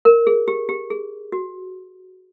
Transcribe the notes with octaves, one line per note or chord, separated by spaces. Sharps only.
A#4
G#4
G4
G4
G#4
F#4